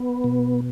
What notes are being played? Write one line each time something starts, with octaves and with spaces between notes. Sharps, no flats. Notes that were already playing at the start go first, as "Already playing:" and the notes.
Already playing: B3
B2